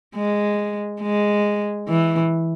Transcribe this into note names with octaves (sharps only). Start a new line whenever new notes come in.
G#3
G#3
E3